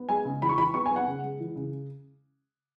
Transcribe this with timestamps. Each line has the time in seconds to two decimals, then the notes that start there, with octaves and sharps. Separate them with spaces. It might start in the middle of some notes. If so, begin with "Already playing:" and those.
Already playing: B3
0.09 G#3 G#5
0.25 C#3
0.42 E3 B5
0.49 C#6
0.57 E3 B5
0.74 B3 C#6
0.86 G#5
0.91 B3 F#5
1.07 C#3
1.24 G#3
1.40 E3
1.56 C#3